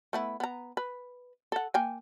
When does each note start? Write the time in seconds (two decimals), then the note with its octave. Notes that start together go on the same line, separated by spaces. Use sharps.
0.13 A3 B3 E4
0.40 B3 A#5
0.77 B4
1.52 A4 F#5
1.74 A#3 G5 G#5